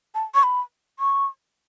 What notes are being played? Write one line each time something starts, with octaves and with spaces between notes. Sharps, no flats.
A5
C#6
B5
C#6